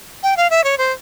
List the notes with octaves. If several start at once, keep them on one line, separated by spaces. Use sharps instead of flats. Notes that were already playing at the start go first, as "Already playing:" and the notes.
G5
F5
E5
C#5
C5